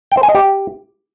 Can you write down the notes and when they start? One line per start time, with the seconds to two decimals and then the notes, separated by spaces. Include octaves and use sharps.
0.12 G5
0.17 C5
0.23 G#5
0.29 D#5
0.35 G4